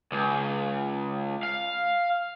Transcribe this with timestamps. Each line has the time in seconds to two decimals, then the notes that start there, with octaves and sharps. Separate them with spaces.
0.12 C#2
1.43 F5